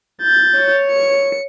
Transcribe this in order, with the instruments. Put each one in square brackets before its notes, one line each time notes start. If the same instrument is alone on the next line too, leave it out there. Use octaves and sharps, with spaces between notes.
[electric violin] G6 A6
[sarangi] C#5
[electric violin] C#7